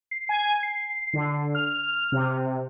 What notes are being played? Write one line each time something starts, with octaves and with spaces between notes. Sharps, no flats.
C7
G#5
C7
D3
F6
C3